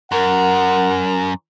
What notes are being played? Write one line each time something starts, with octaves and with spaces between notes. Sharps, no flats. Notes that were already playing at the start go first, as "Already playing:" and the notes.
F#2 A#4 F#5